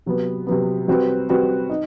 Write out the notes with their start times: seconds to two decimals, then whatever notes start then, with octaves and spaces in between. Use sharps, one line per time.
0.06 C3 F#3 B3
0.47 C3 F#3 B3
0.88 G3 C4 F#4 B4
1.29 G3 C4 F#4 B4
1.70 D#4